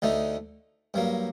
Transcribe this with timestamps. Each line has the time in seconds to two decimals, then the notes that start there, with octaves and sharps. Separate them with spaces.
0.02 D2 D3 A3 D#4
0.94 G2 F#3 A#3